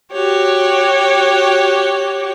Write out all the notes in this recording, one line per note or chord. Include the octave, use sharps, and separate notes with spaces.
F#4 G4 C#5